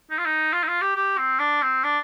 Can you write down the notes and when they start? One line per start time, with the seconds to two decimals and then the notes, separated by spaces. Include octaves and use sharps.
0.10 D#4
0.18 F4
0.26 D#4
0.53 F4
0.63 D#4
0.68 F4
0.82 G4
0.96 G4
1.17 C4
1.39 D4
1.62 C4
1.84 D4